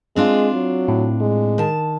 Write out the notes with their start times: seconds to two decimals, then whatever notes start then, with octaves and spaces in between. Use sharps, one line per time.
0.16 G#3 C4 D4 F4
0.54 F#3
0.88 A2
1.21 G#3
1.58 D#3 A5